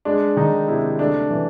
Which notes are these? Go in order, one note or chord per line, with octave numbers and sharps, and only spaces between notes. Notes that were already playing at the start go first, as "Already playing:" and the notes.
G#3 D4
D#3 D#4
C3 E4
A3 D4
E3